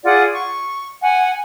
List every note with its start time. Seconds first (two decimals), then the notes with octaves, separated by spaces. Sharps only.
0.04 F4 G#4 D5 F#5
0.32 C#6
1.01 F#5 G#5